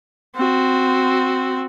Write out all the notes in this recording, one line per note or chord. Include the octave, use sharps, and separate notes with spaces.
C4 F#4